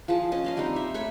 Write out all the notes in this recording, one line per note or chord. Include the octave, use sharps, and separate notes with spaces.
F3 F4 G#4 A5
C#4 D#5 A5
D#5 F5 C6
G3 C4 D4 D#4
C5 E5
A3 C#5 B5